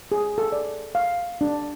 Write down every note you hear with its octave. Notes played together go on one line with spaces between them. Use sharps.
G#4
A4
D5
F5
D4